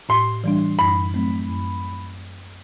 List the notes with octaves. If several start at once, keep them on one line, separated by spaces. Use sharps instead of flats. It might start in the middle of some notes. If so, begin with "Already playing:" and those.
A2 C6
E3 G3 D4
F#2 B5
F#3 A3 C4
F#2